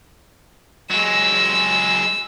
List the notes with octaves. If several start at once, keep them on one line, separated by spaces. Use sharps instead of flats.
F#3 G#3 E6